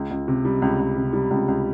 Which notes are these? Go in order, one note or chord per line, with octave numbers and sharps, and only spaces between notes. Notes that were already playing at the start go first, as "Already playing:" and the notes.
Already playing: C#2
C#2
C3
G3
C#2
C#2
C3
G3
C#2
C#2